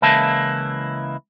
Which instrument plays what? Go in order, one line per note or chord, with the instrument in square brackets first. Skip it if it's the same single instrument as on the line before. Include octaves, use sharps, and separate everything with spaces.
[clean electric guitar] C#2 C#3 E3 A#3 E4 A5